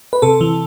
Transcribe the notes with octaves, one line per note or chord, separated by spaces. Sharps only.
B4
C3 A4
E3